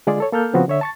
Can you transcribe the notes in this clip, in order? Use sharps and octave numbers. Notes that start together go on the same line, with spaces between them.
D3 G#3 F4 G#4 D5
A4 C#5
A#3 A4 F6 G6
C#3 F3 B3 C4 F#4
D3 C#5 E5
A5 C#6 A6